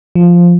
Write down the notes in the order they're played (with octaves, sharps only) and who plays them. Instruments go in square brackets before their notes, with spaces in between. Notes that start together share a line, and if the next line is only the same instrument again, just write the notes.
[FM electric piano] F3